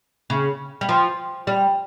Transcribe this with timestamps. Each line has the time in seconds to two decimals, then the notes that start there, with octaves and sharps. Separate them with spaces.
0.30 C#3
0.81 G3
0.89 F3
1.47 G3